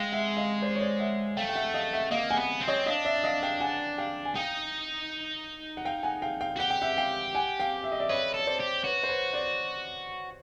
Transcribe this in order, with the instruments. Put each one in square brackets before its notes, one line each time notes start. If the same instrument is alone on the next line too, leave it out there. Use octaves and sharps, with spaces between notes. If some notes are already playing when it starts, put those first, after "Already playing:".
Already playing: [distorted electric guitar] G#3 [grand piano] F5 G5
[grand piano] E5 F#5
D#5 F5
C5 D5
C#5
C5 D5
E5 F#5
[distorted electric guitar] A3 [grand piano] F5 G5
[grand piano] G5
E5 F#5
D#5 F5
E5 F#5
[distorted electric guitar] A#3 [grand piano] D#5 F5
[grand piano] F#5 G#5
[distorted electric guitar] B3
C4
[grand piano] C#5 D#5
[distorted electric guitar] D4 [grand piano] D#5 F5
[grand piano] D5 E5
D#5 F5
F5 G5
F#5 G#5
F5 G5
G#5
[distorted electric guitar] D#4 [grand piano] F5 G5
[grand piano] F#5
F5 G5
F#5 G#5
F5 G5
F5 G5
[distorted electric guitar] F#4
[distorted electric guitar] G4 [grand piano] F#5
[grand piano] G5
E5 F#5
F5 G5
F#5 G#5
F5 G5
E5
D#5
D5 E5
[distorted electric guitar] B4 [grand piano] C#5 D#5
[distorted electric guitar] A4
[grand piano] C#5
C5 D5
[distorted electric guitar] G4
[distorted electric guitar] F#4 [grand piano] B4 C#5
[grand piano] C5
B4 C#5
C5 D5